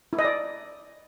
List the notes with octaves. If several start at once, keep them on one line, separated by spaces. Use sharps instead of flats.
E4
D#5
D5